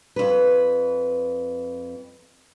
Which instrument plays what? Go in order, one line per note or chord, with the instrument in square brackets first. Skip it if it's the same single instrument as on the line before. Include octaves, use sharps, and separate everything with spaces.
[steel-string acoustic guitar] F2 B4